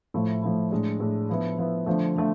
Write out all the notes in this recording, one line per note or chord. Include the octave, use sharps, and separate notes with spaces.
A2 F3 A3 E4
A2 F3 A3 E4
A2 G#3 D4
A2 G#3 D4
F3 B3 E4
F3 B3 E4
D3 F3 A3
D3 F3 A3